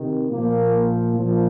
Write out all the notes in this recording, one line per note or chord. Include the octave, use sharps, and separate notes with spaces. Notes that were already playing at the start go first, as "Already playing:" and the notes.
Already playing: C3 D#3
A#2 F3 A#3
A#2 F3